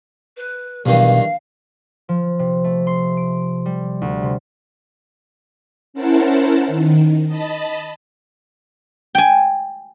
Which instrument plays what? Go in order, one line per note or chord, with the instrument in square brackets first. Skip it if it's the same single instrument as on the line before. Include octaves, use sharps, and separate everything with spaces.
[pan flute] B4
[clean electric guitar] B1 [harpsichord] G2 D#3 E3 [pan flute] F5
[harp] F3
C3
A3
C6
D7
G3
D2
C3
[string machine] C#4 E4 A#4 C5 F#5 A5
D#3
D#5 A5 B5
[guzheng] G5 G#5